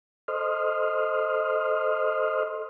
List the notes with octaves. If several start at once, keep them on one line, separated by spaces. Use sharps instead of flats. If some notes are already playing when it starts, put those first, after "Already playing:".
A4 C5 D#5 C6 D#6 F6